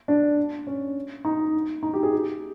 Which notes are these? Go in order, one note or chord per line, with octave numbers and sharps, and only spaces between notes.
D4
C#4
D#4
D#4
G4
G#4
G4